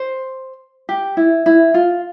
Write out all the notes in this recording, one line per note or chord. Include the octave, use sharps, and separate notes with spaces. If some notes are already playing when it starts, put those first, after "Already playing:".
Already playing: C5
G4
E4
E4
F4